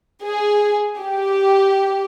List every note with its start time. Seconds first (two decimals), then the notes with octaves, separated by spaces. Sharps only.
0.23 G#4
0.98 G4